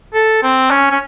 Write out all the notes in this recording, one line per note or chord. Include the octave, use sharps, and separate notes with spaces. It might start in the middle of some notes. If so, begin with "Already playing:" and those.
A4
C4
C#4
C#4